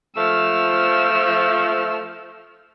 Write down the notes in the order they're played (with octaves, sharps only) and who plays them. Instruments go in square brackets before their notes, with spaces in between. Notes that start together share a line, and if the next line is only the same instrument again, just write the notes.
[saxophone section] F3 A3 [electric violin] E6 F6